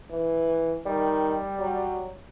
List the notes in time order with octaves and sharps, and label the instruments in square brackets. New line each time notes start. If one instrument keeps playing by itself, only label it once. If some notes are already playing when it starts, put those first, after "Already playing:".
[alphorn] E3
[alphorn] D#3 [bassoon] G3
[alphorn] F#3